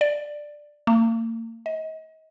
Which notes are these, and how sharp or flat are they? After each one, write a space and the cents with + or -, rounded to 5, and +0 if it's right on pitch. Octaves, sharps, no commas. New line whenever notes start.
D5 +10
A#3 -40
D#5 +35